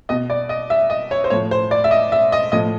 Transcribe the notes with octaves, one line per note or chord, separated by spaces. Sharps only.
B2 D#5
D5
D#5
E5
D#5
C#5
C5
A2 F3 C#5
C5
D5
E5
D#5
E5
D#5
A2 F3 D#5